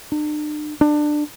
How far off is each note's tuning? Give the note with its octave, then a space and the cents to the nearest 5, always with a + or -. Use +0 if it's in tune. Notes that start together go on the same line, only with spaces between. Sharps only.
D4 +45
D4 +20